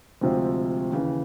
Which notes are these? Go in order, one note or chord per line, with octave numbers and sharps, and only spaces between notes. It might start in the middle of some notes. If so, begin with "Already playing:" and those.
D2 C3 F3 G#3 C4
D#2 C#3 E3